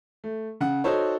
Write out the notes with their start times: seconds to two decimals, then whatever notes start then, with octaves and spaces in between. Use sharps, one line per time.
0.24 A3
0.61 C#3 F#5
0.84 D#4 F#4 A4 C5 C#5